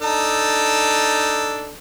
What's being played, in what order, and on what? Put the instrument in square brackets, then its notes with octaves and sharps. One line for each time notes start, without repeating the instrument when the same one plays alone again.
[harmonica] D4 D#4 A4